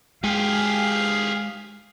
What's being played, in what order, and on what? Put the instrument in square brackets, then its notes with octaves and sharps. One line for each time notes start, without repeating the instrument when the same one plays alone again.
[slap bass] G#3 [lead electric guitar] G4 G#4 [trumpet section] F5